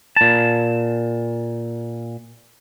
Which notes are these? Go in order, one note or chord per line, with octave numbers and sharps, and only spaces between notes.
A#2 A5